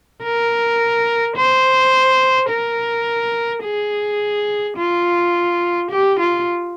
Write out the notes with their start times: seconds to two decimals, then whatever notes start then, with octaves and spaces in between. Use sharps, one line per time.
0.23 A#4
1.36 C5
2.50 A#4
3.64 G#4
4.77 F4
5.91 G4
6.19 F4